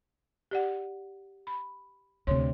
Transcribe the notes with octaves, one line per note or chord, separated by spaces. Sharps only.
G4 D5 F#5
B5
D2 C3 C#5 C6